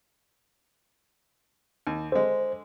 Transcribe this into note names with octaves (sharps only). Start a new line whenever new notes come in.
D#2
D3 G#3 C5